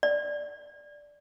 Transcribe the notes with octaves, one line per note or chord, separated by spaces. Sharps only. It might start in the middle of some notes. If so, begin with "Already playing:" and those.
D5